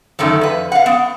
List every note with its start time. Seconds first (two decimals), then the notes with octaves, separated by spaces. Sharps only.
0.19 F#2 D3 D#3 A3
0.41 F2 B4
0.72 F5 F#5
0.86 B3